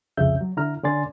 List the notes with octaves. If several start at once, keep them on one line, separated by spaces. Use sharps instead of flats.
C2 F2 C#3 E5 G6
F#3
D3 E4 A#5 F6
D3 C#4 D5 G#5 C6 A6